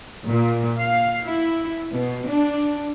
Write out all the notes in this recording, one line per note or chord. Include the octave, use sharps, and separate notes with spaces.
A#2
F5
E4
B2
D4